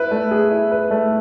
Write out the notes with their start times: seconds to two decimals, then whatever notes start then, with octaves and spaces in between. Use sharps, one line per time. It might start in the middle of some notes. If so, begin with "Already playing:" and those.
Already playing: E4 B4
0.11 A3
0.31 G#4
0.51 E4
0.72 B4
0.91 A3